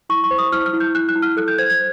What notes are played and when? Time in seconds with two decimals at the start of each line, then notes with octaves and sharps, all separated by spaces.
0.09 E4 C#6
0.24 C#6
0.31 C5
0.38 D#6
0.52 E4 F6
0.66 F6
0.73 E4
0.80 G6
0.95 E4 F#6
1.09 F#6
1.15 E4
1.22 F6
1.37 A4 F#6
1.48 G6
1.58 C5 G#6
1.70 G#6